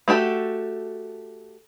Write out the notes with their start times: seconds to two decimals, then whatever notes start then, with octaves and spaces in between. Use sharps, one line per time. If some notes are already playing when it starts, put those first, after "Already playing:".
0.08 A3 F#4 G4 A4